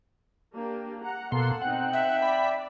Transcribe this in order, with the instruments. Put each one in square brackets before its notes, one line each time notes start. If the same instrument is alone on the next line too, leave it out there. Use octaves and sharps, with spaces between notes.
[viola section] A#3 D4 G4
F#5 A#5
[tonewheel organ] B2 C6 [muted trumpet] A#3 [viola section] A4 F#5
[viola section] C4 D#4 [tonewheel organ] F#5 [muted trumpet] G5
[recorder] E5
[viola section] D5 [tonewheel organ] B5